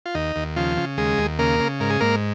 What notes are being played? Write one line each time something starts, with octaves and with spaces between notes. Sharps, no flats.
F4
D#2 D#4
D#2
C#3 F3 F4
C#3
D#2 G#3 G#4
D#2
C#3 A#3 A#4
C#3
G#2 A#4
G#4
G#2 A#3 A#4